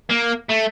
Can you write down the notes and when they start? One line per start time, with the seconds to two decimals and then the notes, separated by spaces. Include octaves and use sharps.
0.10 A#3
0.49 A3